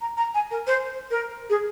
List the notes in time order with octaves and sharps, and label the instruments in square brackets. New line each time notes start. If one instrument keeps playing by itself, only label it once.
[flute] A#5
A#5
G#5
A#4
C5
A#4
G#4